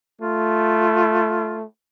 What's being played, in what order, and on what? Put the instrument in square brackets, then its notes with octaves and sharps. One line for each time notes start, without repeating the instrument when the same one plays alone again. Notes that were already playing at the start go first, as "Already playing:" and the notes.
[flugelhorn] A3 [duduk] F4